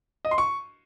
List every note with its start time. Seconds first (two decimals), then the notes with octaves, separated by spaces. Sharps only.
0.25 D#5
0.31 C6
0.38 C#6